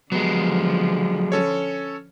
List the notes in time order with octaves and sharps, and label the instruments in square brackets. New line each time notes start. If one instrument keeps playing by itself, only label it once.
[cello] D3 F3 [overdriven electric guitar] F#3 G#3 [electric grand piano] B3
[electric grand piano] C#4 A4 C#5